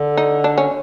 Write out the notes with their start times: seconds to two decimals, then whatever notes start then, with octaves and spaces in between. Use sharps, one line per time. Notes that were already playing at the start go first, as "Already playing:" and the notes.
Already playing: D3
0.17 D#4
0.44 D4
0.58 C#4